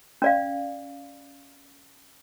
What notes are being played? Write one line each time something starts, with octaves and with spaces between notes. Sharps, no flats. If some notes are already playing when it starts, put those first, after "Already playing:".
C#4 D5 F5